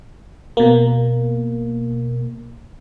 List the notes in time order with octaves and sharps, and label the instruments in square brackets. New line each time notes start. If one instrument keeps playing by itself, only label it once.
[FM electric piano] B2 A#3